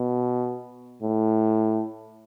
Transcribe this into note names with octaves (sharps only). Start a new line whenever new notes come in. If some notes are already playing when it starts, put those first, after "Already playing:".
Already playing: B2
A2